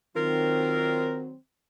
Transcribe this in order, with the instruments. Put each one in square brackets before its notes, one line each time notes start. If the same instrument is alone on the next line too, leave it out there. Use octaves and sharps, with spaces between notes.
[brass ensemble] D#3 F#3 C4 [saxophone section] F4 A#4